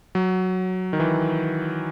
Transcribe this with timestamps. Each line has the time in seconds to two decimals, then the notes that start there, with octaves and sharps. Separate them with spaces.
0.15 F#3
0.93 D#3
1.00 E3